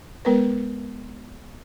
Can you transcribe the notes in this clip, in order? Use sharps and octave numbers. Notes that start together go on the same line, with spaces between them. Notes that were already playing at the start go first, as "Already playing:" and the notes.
G#3 B3 A#4 B4